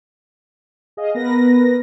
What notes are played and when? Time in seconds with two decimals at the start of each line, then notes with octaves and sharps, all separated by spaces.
0.97 G#4 D#5 F5
1.15 B3 A#4 B4 A#6